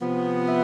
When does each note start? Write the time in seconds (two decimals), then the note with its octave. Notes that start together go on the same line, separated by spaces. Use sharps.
0.01 C3 F3 B3
0.48 E5